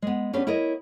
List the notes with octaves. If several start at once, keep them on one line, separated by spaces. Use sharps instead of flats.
G#3 B3
B3 C#4 D4 G4 B4
E4 A#4 C#5 D#5